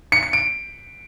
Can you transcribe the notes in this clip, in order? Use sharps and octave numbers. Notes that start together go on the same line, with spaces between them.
C#7
C#7
D7